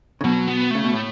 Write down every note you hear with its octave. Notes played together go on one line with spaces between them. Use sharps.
C#3
B2 F#3
B3
C#3 A3
B2
A2